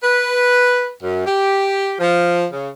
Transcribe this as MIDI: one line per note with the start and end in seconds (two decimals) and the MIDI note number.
0.03 0.90 71
1.02 1.26 42
1.26 1.93 67
1.99 2.44 53
2.52 2.68 49